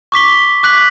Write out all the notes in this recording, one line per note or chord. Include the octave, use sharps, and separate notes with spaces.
C#6 D6 B6 G7
D6 F#6 B6 F#7